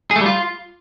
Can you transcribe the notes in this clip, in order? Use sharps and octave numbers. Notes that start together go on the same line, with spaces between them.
G#4
A3
G3
F4